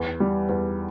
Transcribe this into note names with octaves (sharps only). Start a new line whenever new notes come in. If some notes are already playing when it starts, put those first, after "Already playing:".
Already playing: E2
G3
E2